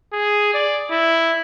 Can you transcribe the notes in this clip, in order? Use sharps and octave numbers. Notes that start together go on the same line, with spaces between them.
G#4
D5
E4